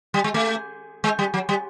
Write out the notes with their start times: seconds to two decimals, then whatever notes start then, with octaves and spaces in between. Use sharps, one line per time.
0.14 G3
0.24 G#3
0.34 A3
1.04 G#3
1.19 G3
1.34 F#3
1.49 G3